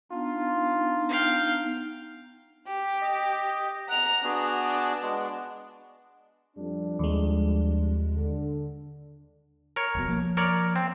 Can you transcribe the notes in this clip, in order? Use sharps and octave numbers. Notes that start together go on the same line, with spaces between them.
B3 D4 D#4 F4
F5 G5
G4
D#5
F#5 A#5 F7
B3 D4 F#4 G#4
G#3 B3 F#4
F2 G3 D4
D#2 G#3
D3
A#4 C#5
F1 C2 B2
F3 A#3
A#4 C#5 D5
C4